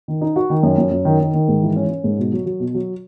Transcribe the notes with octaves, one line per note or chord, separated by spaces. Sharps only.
D#3
D#4
F#4
D#3
F#2
F#2
F#2
D#3
D#3
D#3
G#2
E3
C#4
C#4
G#2
B2
F#3
F#3
B2
F#3